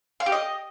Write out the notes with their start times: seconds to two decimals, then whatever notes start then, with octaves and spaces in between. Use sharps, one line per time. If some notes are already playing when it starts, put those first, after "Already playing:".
0.20 F5
0.26 G4
0.32 D#5